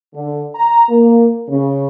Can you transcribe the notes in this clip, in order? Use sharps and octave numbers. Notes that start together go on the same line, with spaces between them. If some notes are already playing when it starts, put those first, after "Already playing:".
D3
A#5
A#3
C#3